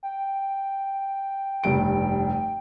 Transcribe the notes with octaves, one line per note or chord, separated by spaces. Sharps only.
G5
F1 G2 D7